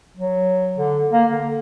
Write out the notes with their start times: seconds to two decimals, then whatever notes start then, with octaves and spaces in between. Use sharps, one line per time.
0.17 F#3
0.77 D3
1.12 A#3
1.32 D3